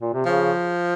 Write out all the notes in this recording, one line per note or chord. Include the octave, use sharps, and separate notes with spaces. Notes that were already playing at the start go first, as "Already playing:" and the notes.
A#2
C3
C#3 F3